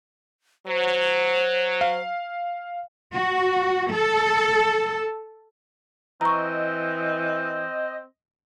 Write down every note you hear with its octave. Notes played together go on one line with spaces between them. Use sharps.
F#3 C5
F5
F#4
A4
E3 C4 D#5 A#5 C#6